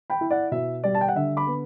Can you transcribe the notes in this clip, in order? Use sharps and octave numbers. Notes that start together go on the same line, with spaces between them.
G5 B5
E4
D5 F#5
B2 E5
G3 D5
A5
G5
F#5
D3 E5
B5 D6
B3